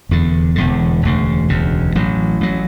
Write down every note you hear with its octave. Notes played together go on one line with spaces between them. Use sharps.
E1 E2 D3
E1 E2 D3
E1 D2 C#3
E1 D2 C#3
A1 A2 F#3
A1 A2 F#3